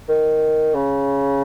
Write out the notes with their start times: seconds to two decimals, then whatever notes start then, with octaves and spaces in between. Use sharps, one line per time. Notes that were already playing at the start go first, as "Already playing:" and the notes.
0.09 D#3
0.74 C#3